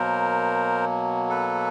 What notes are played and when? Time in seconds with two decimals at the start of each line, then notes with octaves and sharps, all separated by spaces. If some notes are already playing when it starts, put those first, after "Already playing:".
Already playing: B2 F#3 A#3 A#4 C5
1.30 A4 B4